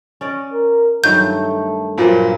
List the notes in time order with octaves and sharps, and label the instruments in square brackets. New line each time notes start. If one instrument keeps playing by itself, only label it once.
[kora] C#4 D5 D#5
[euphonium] A#4
[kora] G2 D#3 F#3 [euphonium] A3 [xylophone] G6
[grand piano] G2 A#2 F#3 [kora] F3 [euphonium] A#3